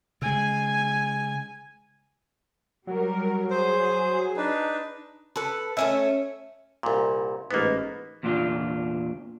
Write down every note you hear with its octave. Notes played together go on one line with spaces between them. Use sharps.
C#3 G#3 G#5
F#3 G3 A#4
G#4 C5
D4 D#4 B4
A4 B4
A3 C#4 E5
C2 A#2
A1 G#2 A#3 B3 B4
E2 A#2 D4 F4